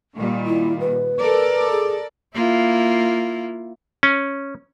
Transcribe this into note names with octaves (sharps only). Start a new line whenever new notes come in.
A#2 D#3 G3
E4
B4
A4 A#4 D5
G#4
A#3 E4 F4
C#4